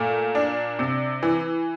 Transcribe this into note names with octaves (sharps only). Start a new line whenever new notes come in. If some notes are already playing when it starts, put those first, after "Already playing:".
Already playing: A#2 A3
D4
C3
E3